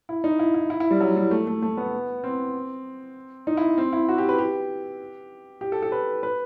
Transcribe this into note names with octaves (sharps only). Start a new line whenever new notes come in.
E4
D#4
E4
E4
E4
E4
G3
F#3
G3
A3
A3
A3
B3
C4
D#4
E4
C4
E4
F#4
G4
B4
G4
G4
A4
A4
B4
B4